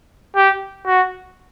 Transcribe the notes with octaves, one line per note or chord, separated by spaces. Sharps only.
G4
F#4